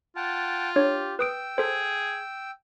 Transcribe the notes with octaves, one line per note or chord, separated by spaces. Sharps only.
F4 F#5 G5 A5
D4 G4 C#5
B4 G5 D#6 E6 D7
G#4 A4 C5